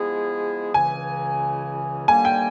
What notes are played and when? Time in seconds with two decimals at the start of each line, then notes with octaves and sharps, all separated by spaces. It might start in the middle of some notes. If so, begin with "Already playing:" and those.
Already playing: F3 G#3 B3 E4 G#4
0.74 C#2 C#3 E3 G#5
2.08 D#2 D3 G3 A#3 G#5
2.25 G5